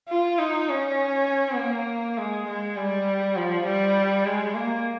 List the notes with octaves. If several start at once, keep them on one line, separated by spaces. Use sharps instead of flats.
F4
D#4
C#4
A#3
G#3
G#3
G3
F3
G3
G#3
A#3